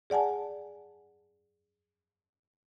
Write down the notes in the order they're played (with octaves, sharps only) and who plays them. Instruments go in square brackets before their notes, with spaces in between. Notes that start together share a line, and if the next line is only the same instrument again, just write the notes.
[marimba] G#4 D5 F#5 G#5 A5